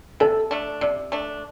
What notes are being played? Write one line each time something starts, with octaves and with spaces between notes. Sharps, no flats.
C3 A4
A3 D4
C3 D5
A3 D4